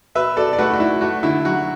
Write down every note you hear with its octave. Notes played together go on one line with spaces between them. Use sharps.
B2 B4 E5
B2 A4 D5
D5
A3 F#4 B4
F#4
A3 E4
A3 F#4
D3 E4
F#3 F#4